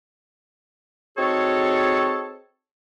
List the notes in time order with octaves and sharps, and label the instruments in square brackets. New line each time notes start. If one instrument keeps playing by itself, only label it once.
[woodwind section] C4 D#4 F#4 G#4 A4 C#5